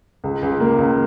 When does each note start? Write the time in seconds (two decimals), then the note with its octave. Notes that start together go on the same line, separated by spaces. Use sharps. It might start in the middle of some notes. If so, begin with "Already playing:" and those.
0.24 C#2
0.42 C#2
0.60 A#3
0.78 C#2